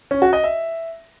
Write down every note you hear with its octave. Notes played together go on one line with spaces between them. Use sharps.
C#4
F#4
D#5
E5